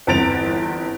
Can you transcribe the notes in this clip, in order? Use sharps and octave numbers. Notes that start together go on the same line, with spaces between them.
G1 E2 C4 A6 D7 F7